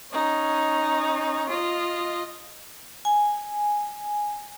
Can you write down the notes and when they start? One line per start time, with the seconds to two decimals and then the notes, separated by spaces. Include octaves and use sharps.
0.12 C#4 D#4
1.49 F4 D#5
3.05 G#5